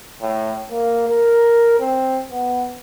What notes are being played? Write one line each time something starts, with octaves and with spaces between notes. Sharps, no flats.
A2
A#3
A#4
C4
B3